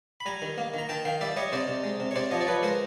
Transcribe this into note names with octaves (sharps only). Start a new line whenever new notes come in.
B5
G3 G#5 A#5
D#3
A#3
D#3 A#5
D#3 G5 A5
D#3 F5 G5
G3 D5 E5
G3 C#5 D#5
C3 C5 D5
C3
G#3
C3
C#5
C3 C5 D5
F3 C#5 D#5
D5
F3 B4 C#5
G#3 A#4 C5